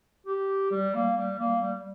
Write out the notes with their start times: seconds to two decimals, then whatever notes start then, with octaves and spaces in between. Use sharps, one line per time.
0.26 G4
0.71 G3
0.94 A#3
1.17 G3
1.39 A#3
1.61 G3